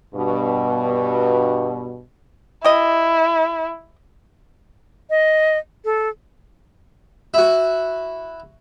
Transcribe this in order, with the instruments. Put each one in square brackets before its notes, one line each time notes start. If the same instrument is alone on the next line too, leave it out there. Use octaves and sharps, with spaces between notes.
[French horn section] G2 B2
[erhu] E4 [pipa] G4 D#5
[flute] D#5
A4
[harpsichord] E4 F#4